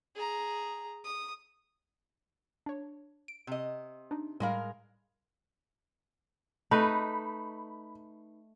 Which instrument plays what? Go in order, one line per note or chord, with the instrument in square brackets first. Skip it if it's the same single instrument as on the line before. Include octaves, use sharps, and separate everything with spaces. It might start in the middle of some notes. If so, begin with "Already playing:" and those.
[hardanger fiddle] G#4 A#5
D#6
[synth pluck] D4 C#5
D7
[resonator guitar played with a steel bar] C3 D#5
[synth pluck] D4 D#4
[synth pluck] A2 G3 B5 [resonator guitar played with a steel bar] G#3 A#4 F5
[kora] A3 D#4 B4 [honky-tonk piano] B5